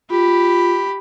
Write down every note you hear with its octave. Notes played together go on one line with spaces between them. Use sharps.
F4 G4 B5